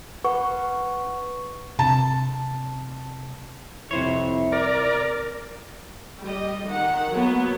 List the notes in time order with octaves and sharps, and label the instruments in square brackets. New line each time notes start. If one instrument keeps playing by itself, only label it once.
[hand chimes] B4 F#5 C#6
[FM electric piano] C3 [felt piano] A5
[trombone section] C2 F2 E4 [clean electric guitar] C3 C5 C#5
[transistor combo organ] A#4 D5
[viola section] G3 D#5
D#3 F#5
F#3 A#3 B3